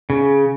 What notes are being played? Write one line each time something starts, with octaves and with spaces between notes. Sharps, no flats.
C#3